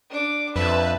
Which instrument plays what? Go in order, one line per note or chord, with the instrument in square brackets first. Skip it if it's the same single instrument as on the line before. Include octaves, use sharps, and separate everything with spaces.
[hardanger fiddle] D4 D6
[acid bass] F2 [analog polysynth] B4 [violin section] E5 [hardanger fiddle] A5